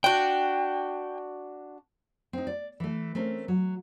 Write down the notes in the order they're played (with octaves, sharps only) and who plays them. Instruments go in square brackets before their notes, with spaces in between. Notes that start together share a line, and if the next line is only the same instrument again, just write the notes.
[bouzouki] D4 F#4 [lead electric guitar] G5
[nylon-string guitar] C4 D#4
D5
E3 A3
A3 C4 C#4 A#4
F#3